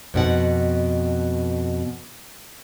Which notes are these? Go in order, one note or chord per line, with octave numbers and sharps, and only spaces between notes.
F2 B2 F#5